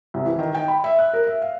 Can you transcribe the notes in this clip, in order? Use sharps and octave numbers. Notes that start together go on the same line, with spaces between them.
C2
E3
D#3
G5
B5
E5
F#6
A#4
E5
F5